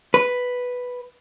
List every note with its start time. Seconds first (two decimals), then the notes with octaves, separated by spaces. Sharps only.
0.14 B4